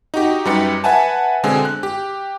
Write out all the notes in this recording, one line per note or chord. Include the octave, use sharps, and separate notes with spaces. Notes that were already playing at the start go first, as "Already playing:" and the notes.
D#4 F#4 G4
F#2 G3 D#4 G4 B4 C#7
B4 E5 F#5 G#5 A5
B2 D3 G#3 C4 G#4
F#6
G4